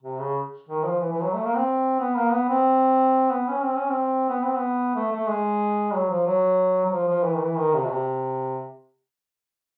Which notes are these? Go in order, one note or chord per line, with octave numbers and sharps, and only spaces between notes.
C3
C#3
D#3
F3
E3
E3
F#3
A3
A#3
C4
B3
A#3
B3
C4
B3
C#4
C4
C#4
C4
B3
C4
B3
A3
A3
G#3
F#3
F3
F#3
F#3
F3
F3
E3
D#3
E3
D#3
C3
B2
C3